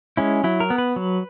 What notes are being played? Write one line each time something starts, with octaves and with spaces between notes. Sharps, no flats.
G#3 C#4 E4
F#3 E4
A#4
B3
B4
F#3